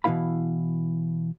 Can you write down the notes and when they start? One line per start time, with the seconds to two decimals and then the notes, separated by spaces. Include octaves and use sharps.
0.04 B2 E3 C#4 E4 F5 B5